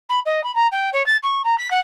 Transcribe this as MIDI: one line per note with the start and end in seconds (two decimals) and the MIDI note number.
0.09 0.19 83
0.25 0.43 75
0.43 0.53 83
0.55 0.67 82
0.71 0.89 79
0.93 1.04 73
1.06 1.16 93
1.22 1.42 85
1.44 1.55 82
1.58 1.70 95
1.70 1.79 78